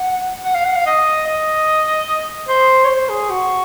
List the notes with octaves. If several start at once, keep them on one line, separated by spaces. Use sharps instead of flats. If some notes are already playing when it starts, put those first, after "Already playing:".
Already playing: F#5
F#5
F5
F#5
F5
D#5
D#5
C5
C#5
C5
G#4
F#4